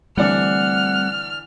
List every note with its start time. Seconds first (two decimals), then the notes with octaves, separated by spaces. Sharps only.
0.17 D3 E3 G3 A3 C4 D4 F#5 F6